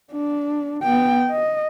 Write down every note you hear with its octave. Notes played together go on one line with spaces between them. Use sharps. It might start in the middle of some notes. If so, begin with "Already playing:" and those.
D4
B3 G5
D#5